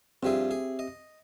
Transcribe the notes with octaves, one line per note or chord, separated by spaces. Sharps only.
G2 F3 C4 G4 G#4 E5
G#4
D#5